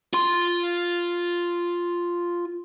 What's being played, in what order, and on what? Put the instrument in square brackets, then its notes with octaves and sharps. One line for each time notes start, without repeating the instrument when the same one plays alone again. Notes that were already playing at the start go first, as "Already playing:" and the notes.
[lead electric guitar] F4 C6